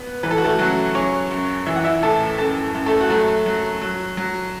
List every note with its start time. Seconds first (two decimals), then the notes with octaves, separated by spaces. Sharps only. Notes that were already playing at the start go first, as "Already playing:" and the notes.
Already playing: B3
0.23 E3 B4
0.31 A4
0.38 F#4
0.45 A3 A4
0.59 C#3 F#3 F#4
0.95 F#3 C#4 C#5
1.31 F#2
1.67 E3 E5
1.76 F#5
1.84 E4 E5
2.03 A2 A4 A5
2.38 F#2 A4 A5
2.75 F#2
2.86 A3 A4
3.01 F#4
3.10 F#3 A3 A4
3.46 F#3
3.82 F#3
4.17 F#3